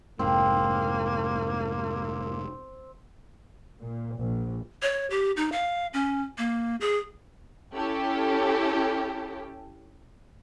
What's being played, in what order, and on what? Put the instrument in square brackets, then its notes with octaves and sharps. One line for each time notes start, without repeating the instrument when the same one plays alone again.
[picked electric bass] F1 G#2 [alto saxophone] A#3 [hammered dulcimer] C4
[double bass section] A#2
A#1
[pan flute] C#5
G4
D#4
F5
C#4
A#3
G#4
[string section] C#4 E4 G4 A4